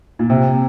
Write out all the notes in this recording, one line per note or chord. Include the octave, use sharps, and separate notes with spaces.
A#2
C3